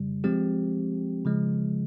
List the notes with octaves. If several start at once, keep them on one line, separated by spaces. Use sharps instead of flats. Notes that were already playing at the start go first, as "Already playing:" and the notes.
Already playing: F2 C#3 G3
F3 G#3 C4 G4
C#3 F3 G#3